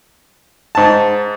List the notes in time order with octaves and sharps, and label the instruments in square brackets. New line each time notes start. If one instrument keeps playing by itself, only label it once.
[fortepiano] G#2 A5